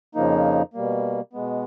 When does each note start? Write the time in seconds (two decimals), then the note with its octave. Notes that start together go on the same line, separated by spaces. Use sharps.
0.15 F2 C#3 F3 A#3 D#4
0.74 B2 G3 A#3
1.33 B2 G#3 B3